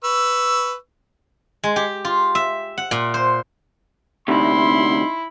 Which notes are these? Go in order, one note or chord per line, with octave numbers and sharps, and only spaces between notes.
B4 C#6 E6
G#3
G4
F4
E5
F#5
A#2
C5
D2 C3 D#4 E4 B5 C6